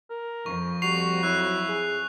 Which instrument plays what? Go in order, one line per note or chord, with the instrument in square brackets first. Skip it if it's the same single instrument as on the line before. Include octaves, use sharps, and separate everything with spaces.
[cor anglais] A#4
[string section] F2 [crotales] C#6
[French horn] G3 [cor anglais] F#4 [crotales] C#6 C7 F7
[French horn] F#3 [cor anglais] E4 [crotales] F#6
[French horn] G#4